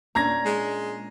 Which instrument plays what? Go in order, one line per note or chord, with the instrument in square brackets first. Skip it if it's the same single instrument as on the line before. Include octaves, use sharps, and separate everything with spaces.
[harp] A#2 C#4 D4 [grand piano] A#5 G#6 A#6
[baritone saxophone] G#3